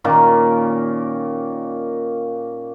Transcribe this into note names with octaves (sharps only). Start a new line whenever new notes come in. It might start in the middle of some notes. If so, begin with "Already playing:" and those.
A#2 D#3 A#3 C#4